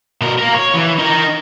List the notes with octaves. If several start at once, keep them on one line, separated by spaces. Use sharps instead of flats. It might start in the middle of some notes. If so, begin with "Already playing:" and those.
B2 A#4
A#3 A#4
C#5
E3
D#4 A#4